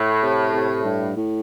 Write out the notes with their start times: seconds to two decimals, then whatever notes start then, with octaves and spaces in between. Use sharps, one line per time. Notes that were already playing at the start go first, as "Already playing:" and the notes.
Already playing: A2
0.22 C3
0.54 C3
0.85 G2
1.16 A2